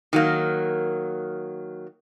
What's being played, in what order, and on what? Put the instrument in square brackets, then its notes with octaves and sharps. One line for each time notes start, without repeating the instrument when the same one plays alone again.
[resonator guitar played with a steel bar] D#3 F#3 A#3